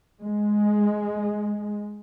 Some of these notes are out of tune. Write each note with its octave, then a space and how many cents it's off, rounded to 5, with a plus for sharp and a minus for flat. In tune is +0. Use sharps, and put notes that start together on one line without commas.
G#3 +5